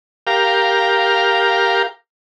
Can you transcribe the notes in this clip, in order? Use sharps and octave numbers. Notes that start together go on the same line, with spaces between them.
G4 A#4 F5